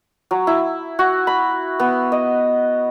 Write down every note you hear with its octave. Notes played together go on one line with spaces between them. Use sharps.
F#3
E4
F#4
B5
B3
D#5